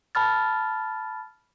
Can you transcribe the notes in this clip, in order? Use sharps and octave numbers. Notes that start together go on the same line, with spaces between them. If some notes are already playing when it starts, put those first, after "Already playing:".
A5 B5 F6 A6